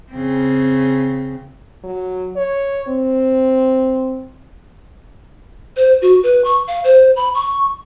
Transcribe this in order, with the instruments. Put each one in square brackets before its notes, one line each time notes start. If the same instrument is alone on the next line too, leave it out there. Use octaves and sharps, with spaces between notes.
[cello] C#3 C4
[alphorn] F#3
C#5
C4
[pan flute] C5
F#4
B4
C#6
F5
C5
B5
C#6